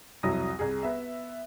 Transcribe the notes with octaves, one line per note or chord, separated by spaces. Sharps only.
C2 F2 F#3 E4 D#6 A#6
C2 G#4
B3 E5